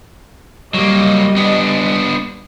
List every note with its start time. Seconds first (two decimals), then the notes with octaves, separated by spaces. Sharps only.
0.74 F#3 G3 A#3 D#5
1.36 B3 D4